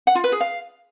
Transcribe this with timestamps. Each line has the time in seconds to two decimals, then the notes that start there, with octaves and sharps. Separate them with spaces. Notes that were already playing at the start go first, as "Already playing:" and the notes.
0.07 F#5
0.15 F4
0.24 B4
0.32 G#4
0.40 F5